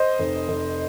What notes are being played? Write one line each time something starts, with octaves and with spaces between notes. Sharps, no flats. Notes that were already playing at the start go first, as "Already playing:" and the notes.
Already playing: C5 D#5
F1
F1